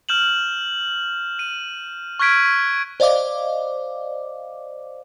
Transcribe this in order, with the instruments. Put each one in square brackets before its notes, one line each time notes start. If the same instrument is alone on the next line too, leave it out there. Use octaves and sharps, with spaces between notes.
[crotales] F6 G6 E7 F#7
D#7
C#6 F6 F#6 G#6 B6 D7
[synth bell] C5 D5 D#5 F5 D6